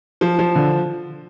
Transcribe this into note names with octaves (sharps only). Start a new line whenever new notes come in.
F3
F3
D3